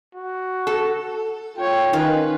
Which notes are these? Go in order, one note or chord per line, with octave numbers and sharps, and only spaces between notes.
F#4
A4
F4 C#5 G5
D#3 C#4 F4 B4